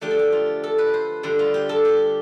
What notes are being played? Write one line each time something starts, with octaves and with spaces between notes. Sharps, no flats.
D3 F3 A3 D4 G4
A4
G4
F4
A4
B4
C5
G2 D3 G3
F4
G4
A4
G4